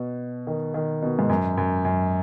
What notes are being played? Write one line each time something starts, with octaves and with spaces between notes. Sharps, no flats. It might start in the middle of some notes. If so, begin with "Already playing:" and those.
Already playing: B2
D#3
D#3
B2
G#2
F#2
F#2
F#2